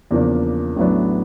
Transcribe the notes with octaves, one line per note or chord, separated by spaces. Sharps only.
E2 C#3 F3 A#3 D4
A1 A2 F#3 B3 D4